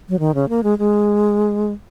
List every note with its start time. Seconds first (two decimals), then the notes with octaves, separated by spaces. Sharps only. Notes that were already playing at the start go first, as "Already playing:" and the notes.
0.09 F#3
0.19 D#3
0.35 C#3
0.49 A#3
0.64 G#3
0.79 G#3